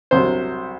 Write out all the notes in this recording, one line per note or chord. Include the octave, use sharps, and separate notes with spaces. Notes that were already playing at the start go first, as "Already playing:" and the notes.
C2 C3 F#3 C5